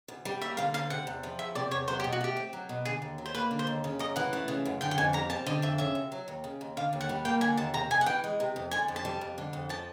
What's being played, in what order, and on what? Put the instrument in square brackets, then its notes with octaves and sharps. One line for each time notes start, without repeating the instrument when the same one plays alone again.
[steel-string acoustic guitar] D2
G3
[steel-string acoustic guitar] A#3 [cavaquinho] E5
[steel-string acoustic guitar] D3 [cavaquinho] F5
[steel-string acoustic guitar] D2 [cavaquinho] F5
[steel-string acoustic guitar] C3 [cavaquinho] F#5
[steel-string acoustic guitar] E2
F3
[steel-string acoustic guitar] E2 [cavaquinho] E5
[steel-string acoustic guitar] C3 [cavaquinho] D5
[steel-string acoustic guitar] E2 [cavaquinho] C#5
[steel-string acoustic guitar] F#3 [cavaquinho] C5
[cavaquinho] G4
[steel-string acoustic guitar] B2
[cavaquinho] F#4
[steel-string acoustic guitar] A3 [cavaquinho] G4
[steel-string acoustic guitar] C4
F#3
B2
[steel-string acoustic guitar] D3 [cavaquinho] G#4
[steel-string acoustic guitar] D#2
F#3
[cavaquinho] C5
[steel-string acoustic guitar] A#3 [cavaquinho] B4
[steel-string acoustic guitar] D3
[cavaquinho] C5
[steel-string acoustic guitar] D#2
C#3
[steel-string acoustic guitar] F#2 [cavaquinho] D#5
[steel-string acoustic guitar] E3 [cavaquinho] F#5
[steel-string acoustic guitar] A3
C#3
F#2
[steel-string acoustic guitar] D3 [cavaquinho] G5
[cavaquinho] G5
[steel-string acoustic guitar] F2 [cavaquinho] G#5
[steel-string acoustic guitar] G3 [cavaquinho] A#5
[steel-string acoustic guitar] C4 [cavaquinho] A5
[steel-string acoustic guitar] D3 [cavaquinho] D#5
[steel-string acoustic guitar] F2 [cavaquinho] E5
[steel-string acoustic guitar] C#3 [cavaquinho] E5
[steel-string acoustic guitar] D#2
F#3
D#2
C#3
D#2
[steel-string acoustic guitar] D3 [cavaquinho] F5
[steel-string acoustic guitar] D#2
[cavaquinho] F#5
[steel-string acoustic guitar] G3
[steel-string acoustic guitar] A#3 [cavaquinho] G5
[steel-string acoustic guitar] D3 [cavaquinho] G#5
[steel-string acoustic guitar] D#2 [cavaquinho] A5
[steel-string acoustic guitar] C3 [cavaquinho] A#5
[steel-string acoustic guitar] F2 [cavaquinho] G#5
[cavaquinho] F#5
[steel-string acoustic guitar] E3 [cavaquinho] G5
[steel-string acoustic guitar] G#3
C3
F2
[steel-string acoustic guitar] D3 [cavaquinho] G#5
[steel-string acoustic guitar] F2
[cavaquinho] A5
[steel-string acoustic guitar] G3
F2
D3
F2
[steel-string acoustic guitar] F3 [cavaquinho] A5